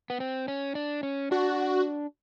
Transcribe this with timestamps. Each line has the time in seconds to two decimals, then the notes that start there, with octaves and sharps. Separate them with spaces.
0.10 B3
0.20 C4
0.48 C#4
0.75 D4
1.03 C#4
1.31 D4 F#4